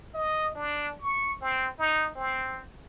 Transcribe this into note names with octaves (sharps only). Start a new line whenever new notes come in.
D#5
D4
C#6
C4
D#4
C4